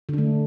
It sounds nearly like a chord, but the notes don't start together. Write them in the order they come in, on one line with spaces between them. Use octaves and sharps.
D3 D4 A3